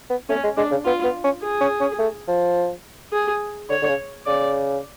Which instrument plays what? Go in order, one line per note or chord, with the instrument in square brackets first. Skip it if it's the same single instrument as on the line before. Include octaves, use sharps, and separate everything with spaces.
[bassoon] B3
[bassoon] A3 [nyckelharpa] C#4
[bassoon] G#3
[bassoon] G#3 [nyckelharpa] D4
[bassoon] C#3
[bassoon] B3 [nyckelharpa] F4
[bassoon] B3
C#4
[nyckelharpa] G#4
[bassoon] C#4
C#4
A3
F3
[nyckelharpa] G#4
[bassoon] D3 [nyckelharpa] C#5
[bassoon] D3
C#3
[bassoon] C#3 [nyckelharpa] D5